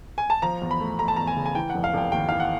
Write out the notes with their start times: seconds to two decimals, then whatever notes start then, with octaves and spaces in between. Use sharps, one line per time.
0.18 G#5
0.30 A5
0.42 F3 A#5
0.62 E2
0.71 B5
0.80 A3
0.99 A3 A#5
1.08 A5
1.16 E2 A#5
1.27 G#5
1.37 C#3
1.46 G#5
1.55 E3 G5
1.70 F1 F#5
1.84 F5
1.94 F1 G5
2.12 D#2 G5
2.29 E3 F5
2.40 F#5